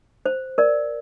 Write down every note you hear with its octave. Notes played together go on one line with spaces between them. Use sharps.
C5
A#4 D5